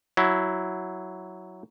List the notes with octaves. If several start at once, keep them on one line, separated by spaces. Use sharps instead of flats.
F#3 E4